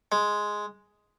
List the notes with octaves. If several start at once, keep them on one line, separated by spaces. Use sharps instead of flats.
G#3